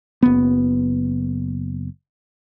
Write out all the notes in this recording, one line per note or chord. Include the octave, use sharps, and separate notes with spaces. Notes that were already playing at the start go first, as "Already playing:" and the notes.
F#1 B3